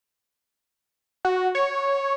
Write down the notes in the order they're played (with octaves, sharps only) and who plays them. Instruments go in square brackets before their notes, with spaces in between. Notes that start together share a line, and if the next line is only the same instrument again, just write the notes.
[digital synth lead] F#4
C#5